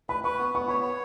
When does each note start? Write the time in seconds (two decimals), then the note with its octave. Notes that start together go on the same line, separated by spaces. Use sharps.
0.09 B4 B5
0.24 B4 C#6
0.39 B3
0.54 B3 C#6
0.68 C#5 B5
0.83 C#5